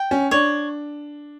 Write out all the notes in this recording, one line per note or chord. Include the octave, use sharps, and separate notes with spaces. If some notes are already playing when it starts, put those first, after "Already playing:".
Already playing: G5
C#4
D4 C#5